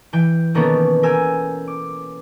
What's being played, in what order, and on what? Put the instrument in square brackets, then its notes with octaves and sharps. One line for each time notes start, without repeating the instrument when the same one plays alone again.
[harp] E3 G5
B2 D#3 A#3 B3 C#4 A4
A#4 G5 G#5 E6
D6